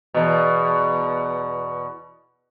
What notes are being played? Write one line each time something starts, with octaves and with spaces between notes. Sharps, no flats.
E2 B2